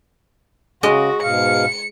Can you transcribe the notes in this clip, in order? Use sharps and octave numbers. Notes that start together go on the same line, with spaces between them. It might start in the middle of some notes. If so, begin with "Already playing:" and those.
C#3 G#3 F#4 D#5
G#2 B2 F5 C#7